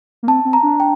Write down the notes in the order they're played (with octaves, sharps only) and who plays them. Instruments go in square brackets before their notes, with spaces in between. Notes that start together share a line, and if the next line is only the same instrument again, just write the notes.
[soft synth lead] A#3
[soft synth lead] C4 [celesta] A5
[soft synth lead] C4
[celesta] A#5
[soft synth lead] D4
[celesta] G5